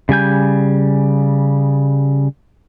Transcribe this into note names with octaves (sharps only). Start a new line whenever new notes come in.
C#3 G3 G#5 G6